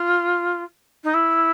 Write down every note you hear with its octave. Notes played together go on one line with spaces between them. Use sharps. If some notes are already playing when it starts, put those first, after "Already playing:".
Already playing: F4
D#4
E4